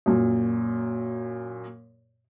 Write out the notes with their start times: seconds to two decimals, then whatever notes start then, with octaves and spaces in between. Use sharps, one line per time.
0.06 F#2 A#2